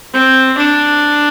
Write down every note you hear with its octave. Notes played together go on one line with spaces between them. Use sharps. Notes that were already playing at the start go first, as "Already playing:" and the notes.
C4
D4